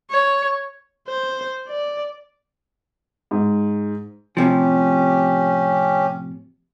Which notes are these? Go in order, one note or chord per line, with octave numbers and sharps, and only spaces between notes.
C#5
C5
D5
G#2
A2 C3 F3 C#4 G4